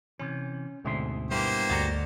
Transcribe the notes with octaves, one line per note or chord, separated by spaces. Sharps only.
C3 E3 C#4
D2 G#2 B2 C4 E5 C6
G2 A#3 B3 E4 G4 C5
G1 D2 F#4 D#5 F#5 A#5 A6